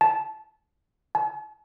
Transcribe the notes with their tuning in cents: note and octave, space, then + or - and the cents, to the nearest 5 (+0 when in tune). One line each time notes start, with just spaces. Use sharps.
A5 -20
A5 -45